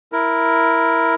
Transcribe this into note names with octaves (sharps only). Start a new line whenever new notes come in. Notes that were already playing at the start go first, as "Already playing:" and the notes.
E4 A#4